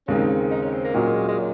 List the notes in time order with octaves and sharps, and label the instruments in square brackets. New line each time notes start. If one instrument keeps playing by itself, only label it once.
[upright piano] D#2 C#3 G#3 C4 D#4 [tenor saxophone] C#4
[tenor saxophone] D#4
C#4
C4
A#3
[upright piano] A#2 F#3 C#4 F#4 A#4 [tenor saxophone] G#3
[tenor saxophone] G#3
F#3